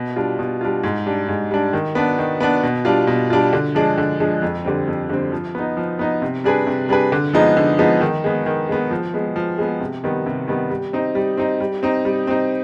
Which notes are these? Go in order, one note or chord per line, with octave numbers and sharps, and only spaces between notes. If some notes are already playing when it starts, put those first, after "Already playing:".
Already playing: B2
G3 D4 F4
B2
G3 D4 F4
G#2
G3 D4
G#2
G3 D4
D#3
B3 D4
D#3
B3 D4
B2
G3 D4 F4
B2
G3 D4 F4
D3
F3 G#3 D4
D3
F3 G#3 D4
F2
D3 G3 C4
F2
D3 G3 C4
F3
B3 D#4
F3
B3 D#4
C3
G3 D4 G#4 B4
C3
G3 D4 G#4 B4
D3
F3 G#3 B3 D#4
D3
F3 G#3 B3 D#4
D#3
G#3 B3
D#3
G#3 B3
F3
G#3 B3
F3
G#3 B3
C3
D#3 G3 B3
C3
D#3 G3 B3
G3
C4 D#4
G3
C4 D#4
G3
C4 D#4
G3
C4 D#4